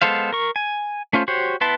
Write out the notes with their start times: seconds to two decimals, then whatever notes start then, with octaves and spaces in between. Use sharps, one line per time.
0.02 G#3 B3 A4 C5 F5
0.33 A#4 C#6
0.56 G#5
1.13 A3 C#4 F4 C5
1.28 F#4 G4 C5 C#5
1.61 B3 E4 B4 A5 C6